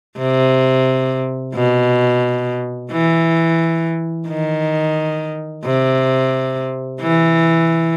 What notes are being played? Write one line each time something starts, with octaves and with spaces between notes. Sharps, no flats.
C3
B2
E3
D#3
C3
E3